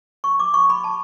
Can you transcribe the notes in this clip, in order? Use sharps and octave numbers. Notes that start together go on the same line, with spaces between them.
C#6
D6
C#6
B5
A5